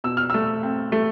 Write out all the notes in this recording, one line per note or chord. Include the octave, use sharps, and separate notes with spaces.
B2 E6
F6
A3 E6
C4
A3